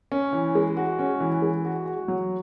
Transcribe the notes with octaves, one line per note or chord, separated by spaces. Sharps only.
C#4
E3
G#3
F#4
C#4
E3
G#3
F#4
F#4
F#3